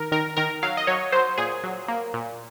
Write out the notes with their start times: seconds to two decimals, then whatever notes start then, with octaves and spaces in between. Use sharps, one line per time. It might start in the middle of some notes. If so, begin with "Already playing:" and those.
Already playing: D#3 A#4
0.12 D#3 A#4
0.37 D#3 A#4
0.63 F#3 F5
0.77 D#5
0.87 F#3 C#5
1.12 F#3 C5
1.38 A#2 G#4
1.64 F#3
1.88 A#3
2.14 A#2